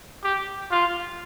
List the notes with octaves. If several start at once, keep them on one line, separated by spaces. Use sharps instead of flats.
G4
F4